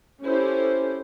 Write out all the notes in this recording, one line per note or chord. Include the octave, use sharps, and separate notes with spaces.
C#4 E4 G4 A4 C5